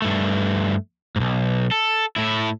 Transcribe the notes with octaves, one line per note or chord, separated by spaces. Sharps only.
G2 A3
B1 G#2
A4
A2 E4